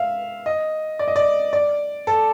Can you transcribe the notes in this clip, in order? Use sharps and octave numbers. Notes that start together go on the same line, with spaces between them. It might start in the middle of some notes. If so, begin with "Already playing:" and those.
Already playing: E5 F5
D#5
D5
D#5
D5
D5
A4